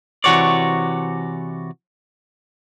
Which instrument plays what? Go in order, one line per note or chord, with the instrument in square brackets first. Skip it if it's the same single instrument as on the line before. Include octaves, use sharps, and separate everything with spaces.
[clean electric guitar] C3 E3 F#4 C#5 D5